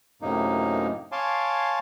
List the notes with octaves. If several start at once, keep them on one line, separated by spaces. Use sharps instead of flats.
F#2 A2 C3 A#3 D#4
C#5 F5 G#5 A5 C6 D6